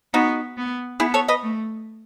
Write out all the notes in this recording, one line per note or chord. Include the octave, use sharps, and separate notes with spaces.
B3 D#4 F#4
B3
B3 E4 G#4
A4 C#5
B4 D#5
A3